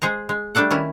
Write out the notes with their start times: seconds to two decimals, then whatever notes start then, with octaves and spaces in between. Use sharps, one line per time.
0.02 G#3 G#4 C5 A#5
0.29 G#3
0.55 G3 A3 D4 A4 F#5
0.70 D#3 C#4 E4